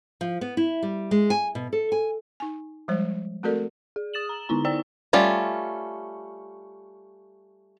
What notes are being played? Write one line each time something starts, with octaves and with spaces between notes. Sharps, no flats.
F3
B3
E4
G3
G#3
G#5
B2
A4
G#5
D#4 G#5
F3 G3 G#3 C5
A3 C4 F#4 A4 A#4 D5
G#4
D#6 A6 E7 F#7
A#5
D3 B3 D#4 E4 A#5
C5 D5 G5 A#5 E6
G3 A3 C#4 F4